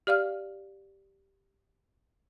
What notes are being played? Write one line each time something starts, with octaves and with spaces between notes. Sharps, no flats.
G4 D5 F5 F6